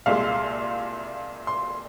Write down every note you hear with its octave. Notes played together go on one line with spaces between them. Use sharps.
C2 A#2 G#3 F5
C6